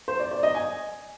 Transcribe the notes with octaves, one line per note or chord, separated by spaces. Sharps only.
C5
D5
D5
D#5
G#5